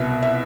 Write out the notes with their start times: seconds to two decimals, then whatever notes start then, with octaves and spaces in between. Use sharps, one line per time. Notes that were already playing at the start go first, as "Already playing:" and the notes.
Already playing: C2 B2 E5
0.22 E5